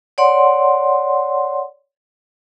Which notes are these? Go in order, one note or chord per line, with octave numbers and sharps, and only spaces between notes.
C#5 D5 F#5 C6